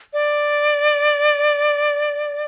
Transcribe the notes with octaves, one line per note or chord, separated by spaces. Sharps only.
D5